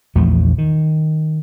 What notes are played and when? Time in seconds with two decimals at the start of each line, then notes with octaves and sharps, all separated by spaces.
0.15 A#1 E2 F3 A3
0.58 D#3